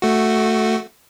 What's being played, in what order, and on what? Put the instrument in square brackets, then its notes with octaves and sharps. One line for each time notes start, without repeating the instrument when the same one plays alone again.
[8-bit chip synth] A3 F#4